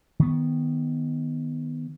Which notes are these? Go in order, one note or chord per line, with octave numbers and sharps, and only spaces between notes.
D#3 B3